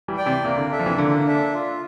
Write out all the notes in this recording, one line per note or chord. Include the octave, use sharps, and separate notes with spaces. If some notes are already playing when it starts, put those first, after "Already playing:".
E3 G3
D5 G5
C3 E3
C3 A#3
D3
D4 A4 E5
F3
C3 E3
D3 A#3
D4 A4 E5
F4